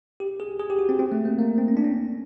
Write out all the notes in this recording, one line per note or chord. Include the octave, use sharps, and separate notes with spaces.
G4
G#4
G#4
G4
F#4
C4
C4
A3
A#3
A#3
C4
C#4
D4
C#4